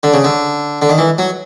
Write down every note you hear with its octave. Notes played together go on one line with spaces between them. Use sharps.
D3
C#3
D3
D3
D#3
E3
F#3